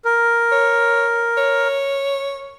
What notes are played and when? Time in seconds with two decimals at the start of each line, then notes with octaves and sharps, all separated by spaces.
0.05 A#4
0.52 C#5
1.37 C#5